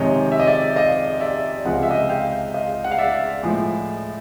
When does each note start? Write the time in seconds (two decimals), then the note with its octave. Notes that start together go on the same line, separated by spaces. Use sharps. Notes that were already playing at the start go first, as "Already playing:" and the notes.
Already playing: F2 C3 D#3 G#3 C#5 D#5
0.32 E5
0.40 D#5
0.47 D5 E5
0.76 D#5 F5
1.20 D5 E5
1.65 C#2 C3 F3 G#3 F#5
1.74 F5
1.83 E5
1.91 D#5 F5
2.09 F5 G5
2.54 D#5 F5
2.84 F#5
2.91 F5
2.98 D5 E5
3.43 A2 F3 G#3